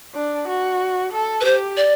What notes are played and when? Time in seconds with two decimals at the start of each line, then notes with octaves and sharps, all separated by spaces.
0.15 D4
0.48 F#4
1.12 A4
1.41 B4
1.45 G4 C5
1.77 D5